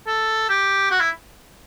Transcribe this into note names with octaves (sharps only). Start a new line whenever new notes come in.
A4
G4
F#4
E4